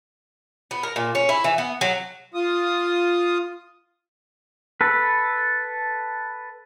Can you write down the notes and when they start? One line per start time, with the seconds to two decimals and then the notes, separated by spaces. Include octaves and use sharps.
0.71 B3
0.83 A#4
0.96 A#2
1.15 C#4
1.29 E4
1.44 E3
1.58 B3
1.81 F#3
2.34 F4 D#6
4.81 A4 B4